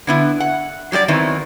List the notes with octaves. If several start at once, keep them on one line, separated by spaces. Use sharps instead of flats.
D3 B3 E4
F#5
F#3 G3 A3 D5
D#3 E3 F#3 B3 C4